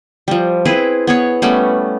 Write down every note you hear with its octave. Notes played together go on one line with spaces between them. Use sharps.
F3 G3
C4 E4 G#4 B4
B3 G#4 C#5
G3 A3 B3 C#4